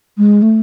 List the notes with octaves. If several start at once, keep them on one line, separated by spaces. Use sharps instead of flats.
G#3
A3